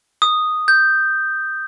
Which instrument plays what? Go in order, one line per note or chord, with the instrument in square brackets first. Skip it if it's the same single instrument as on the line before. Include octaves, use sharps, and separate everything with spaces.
[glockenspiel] D#6
G6